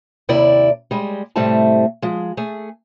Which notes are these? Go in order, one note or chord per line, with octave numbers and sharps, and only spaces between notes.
D#2 C3 E4 D5
G3 G#3
A2 C3 G3 A3 C4 A5
F3 G#3
A3 G#4